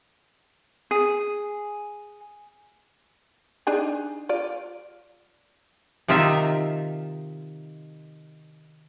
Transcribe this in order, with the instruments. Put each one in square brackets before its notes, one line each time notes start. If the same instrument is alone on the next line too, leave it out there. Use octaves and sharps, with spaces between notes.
[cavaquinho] G#4
[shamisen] D4 D#4 G#4
F4 D5
[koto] C3 D#3 D#4 F4 E5